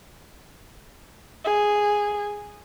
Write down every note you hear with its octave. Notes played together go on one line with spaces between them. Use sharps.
G#4